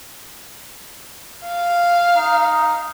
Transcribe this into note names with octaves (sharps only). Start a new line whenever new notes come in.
F5
D#4